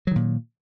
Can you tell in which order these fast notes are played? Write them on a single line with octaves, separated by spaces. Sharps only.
F#3 D#3 A#2